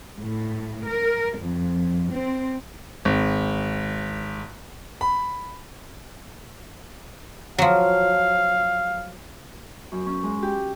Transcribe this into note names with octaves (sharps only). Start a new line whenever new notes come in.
A2
A#4
F2
C4
G#1
B5
F3 F#3 F5
F#2
C#4
G#3
G4